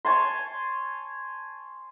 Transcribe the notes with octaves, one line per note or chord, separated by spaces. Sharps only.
C#5 G#5 A5 C6